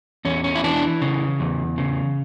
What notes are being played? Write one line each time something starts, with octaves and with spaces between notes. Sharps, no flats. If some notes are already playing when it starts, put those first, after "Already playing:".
E2 C#4
C#4
E4
E3 D4
C#3
E2
C#3